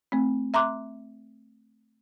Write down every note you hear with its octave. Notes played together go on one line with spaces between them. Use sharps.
A3 C4
E5 A#5 C6 D6 F#6